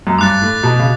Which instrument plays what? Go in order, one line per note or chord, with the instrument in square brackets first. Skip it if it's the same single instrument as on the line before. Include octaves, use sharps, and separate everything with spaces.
[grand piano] F#2
[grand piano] G2 [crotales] D6 F#6 A6
[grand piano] A2
B2
C#3